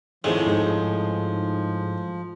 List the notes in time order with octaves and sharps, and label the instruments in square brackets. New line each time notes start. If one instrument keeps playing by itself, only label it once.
[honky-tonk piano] G#1 G#4 C5 [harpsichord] A2 G#3 C4 [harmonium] F3
[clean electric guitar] G#2 [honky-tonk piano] D#4 G#4